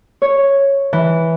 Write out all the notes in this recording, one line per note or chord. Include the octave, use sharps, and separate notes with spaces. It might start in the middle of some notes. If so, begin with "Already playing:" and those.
C#5
E3